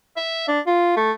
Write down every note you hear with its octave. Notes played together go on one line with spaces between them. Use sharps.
E5
D4
F4
A3